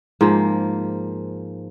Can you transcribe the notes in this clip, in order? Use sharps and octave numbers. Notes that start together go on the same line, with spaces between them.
G#2 F3 A#3